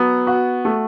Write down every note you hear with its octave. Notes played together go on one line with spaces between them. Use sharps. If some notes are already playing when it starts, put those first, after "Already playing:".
Already playing: F#3 B3
F#4
A3